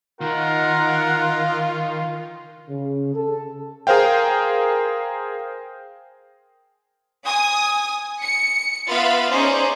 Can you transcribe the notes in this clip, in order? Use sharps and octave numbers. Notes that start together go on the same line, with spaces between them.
D#3 F4 A#4 F#5
C#3
A4
G#4 A#4 C5 F5 G5
G#5 D#6
C#7
B3 F4 E5 F5 B5 A6
C#4 D#4 G#4 C5 D5